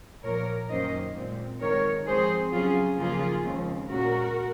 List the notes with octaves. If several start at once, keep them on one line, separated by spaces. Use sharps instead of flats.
A#2 F3 A#3 A#4 C#5
F#2 D#3 F#3 A#3 C#4 C5 D#5
A#2 G#3 C4
G#2 D#3 G#3 A#4 C#5
G#2 F3 C4 G#4 C5
C#3 F#3 C#4 F4 G#4
D#2 C#3 F3 A#3 F4 G#4
D#2 C#3 F3 G#3 C4
A#2 G#3 C#4 F#4 A#4